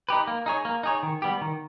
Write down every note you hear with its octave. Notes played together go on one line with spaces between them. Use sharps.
D#4 G4 B4
A#3
D#4 G#4 C#5
A#3
D#4 G#4 C#5
D#3
G3 B3 G4
D#3